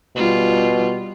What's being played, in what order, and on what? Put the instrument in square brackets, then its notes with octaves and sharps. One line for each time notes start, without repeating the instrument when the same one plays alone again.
[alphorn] B2 [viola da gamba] G3 F4